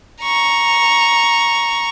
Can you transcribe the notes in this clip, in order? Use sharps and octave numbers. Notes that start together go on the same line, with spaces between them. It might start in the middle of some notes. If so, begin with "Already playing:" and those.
A#5 C#6